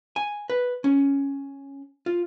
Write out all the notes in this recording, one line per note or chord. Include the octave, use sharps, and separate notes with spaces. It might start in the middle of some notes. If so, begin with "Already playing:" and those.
G#5
B4
C#4
F4